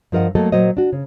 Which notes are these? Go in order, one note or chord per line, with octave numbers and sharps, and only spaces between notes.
G2 F3 A#4 D#5 F#5
F#3 A3 A#3 A4 D#5
A#2 F#3 C5 D#5
D4 F#4
C#3